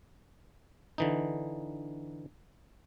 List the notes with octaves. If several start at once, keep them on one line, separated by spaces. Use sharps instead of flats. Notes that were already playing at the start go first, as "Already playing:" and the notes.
D3 E3 D#4